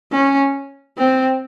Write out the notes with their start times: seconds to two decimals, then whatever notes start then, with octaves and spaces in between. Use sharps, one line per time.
0.12 C#4
0.98 C4